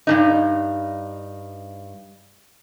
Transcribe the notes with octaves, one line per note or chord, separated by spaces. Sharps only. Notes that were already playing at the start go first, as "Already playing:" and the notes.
G2 C#3 D#4